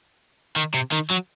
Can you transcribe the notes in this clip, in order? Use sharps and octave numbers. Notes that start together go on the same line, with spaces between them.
D#3
C3
D#3
F#3